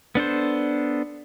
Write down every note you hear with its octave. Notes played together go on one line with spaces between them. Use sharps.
B3 D4 A4 C5